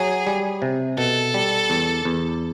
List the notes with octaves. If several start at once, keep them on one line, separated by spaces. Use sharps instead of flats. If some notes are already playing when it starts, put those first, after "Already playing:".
Already playing: F#3 G#4
G3
C3
B2 A4
G3
E2
E2